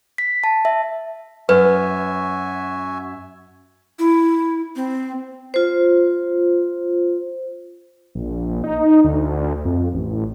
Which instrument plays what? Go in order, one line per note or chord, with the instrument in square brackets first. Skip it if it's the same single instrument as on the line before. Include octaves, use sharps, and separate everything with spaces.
[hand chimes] B6
A5
E5
[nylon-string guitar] F#2 [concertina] F#4 E5 G#5 [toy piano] B4
[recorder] E4
C4
[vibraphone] F4 C5
[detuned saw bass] A#1
D#4
D2
F2
A1